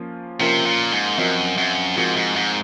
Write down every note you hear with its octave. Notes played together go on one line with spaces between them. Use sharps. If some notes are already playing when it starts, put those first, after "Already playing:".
Already playing: F3 A#3 C#4 F4
C3 F3 A#3 C#4 F4 A#4
A#2
G#2
F#2 F3 C4 F#4 A#4 D#5
F#2
G#2 F3 C4 F#4 A#4 D#5
G#2
G#2